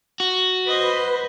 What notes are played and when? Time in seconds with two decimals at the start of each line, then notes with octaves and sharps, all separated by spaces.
0.20 F#4
0.67 B4 C5 D#5